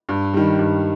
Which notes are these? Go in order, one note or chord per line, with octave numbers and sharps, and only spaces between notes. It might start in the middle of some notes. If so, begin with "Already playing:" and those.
G2
D#3 G3
G2